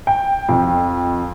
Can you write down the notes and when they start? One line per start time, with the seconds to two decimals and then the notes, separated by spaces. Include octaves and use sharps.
0.07 G5
0.49 F2